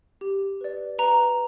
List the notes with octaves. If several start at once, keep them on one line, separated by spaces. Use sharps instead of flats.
G4
B4 D5
B4 A#5